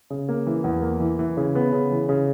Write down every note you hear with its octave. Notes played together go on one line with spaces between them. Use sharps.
C#3
A#3
E3
E2
A#3
E3
E3
C#3
B3
C#3
E3
C#3